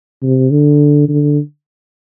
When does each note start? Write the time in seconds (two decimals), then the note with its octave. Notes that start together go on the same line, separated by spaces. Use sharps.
0.22 C3
0.51 D3
1.09 D3